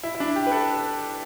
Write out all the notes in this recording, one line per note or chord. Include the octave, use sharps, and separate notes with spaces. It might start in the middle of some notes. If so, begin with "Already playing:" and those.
E4
E4
D4
G4
B4
A4